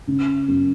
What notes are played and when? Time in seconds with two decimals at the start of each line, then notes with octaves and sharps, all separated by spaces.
0.07 C#3
0.48 F#2